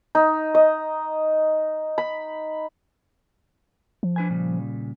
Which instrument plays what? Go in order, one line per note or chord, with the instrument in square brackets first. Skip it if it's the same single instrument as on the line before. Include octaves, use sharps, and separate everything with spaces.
[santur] D#4
D#5
B5
[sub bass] F3
[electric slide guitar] D4 B4 G#5
A#2 C#3 G3